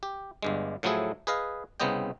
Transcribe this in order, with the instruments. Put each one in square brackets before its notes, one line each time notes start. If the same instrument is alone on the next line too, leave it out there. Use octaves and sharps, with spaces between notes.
[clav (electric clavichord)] G4
G1 G2 G#3
A2 F3 F#3 A3 E4 G#4
G#4 B4 D#5 F5
C2 C#3 B3 C4 D#5 G5